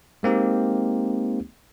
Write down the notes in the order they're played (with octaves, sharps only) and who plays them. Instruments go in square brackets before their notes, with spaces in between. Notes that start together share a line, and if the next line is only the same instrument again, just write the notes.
[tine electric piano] G#3 A#3 C4 D#4 G4